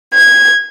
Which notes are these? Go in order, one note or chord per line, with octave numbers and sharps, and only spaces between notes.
G#6